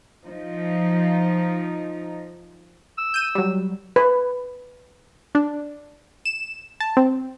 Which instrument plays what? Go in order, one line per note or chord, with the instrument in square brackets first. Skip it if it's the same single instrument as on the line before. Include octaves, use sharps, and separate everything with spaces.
[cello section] F3 D#4
[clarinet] E6
[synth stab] G6 D#7
F#3 G3
[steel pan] B4
[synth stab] D4
E7
A5
C4